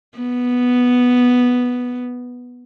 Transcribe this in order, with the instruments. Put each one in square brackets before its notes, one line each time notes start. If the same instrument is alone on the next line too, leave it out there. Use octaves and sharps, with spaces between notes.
[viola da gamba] B3